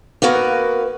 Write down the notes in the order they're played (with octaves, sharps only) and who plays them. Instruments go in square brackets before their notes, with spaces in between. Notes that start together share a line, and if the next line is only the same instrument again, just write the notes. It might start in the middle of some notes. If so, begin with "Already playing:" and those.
[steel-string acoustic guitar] A#3 B3 F#4 A#4 B4